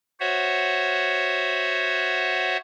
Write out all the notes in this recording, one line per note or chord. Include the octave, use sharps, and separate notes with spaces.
F#4 C5 C#5 E5 F#5